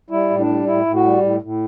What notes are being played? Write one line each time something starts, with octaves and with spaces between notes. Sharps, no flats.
G3 E4
A2
D4
G3
A2 E4
A2
F#4
G3
A2
A2